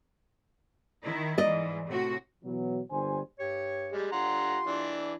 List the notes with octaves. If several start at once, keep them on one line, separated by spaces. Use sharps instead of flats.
D#3 E4
G#2 E3 D5 D#5
A2 C3 F#4
B2 E3 F#3 B3
G1 D3 G3 C5 G#5
G2 G4 C#5
G3 G#3
D3 F4 G4 F#5 A#5 C6
E3 D4